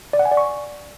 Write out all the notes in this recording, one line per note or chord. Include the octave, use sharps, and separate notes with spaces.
D5
F#5
G#5
D5
C#6